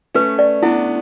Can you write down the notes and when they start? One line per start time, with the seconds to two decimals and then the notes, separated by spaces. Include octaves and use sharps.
0.15 A3 C#4 B4
0.39 D5
0.63 B3 D4 E4